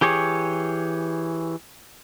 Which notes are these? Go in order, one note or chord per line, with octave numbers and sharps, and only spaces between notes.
E3 G4 G#4 C#5